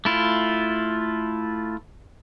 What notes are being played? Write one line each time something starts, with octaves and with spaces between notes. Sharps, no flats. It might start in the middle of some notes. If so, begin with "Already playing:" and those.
A3 E4 F4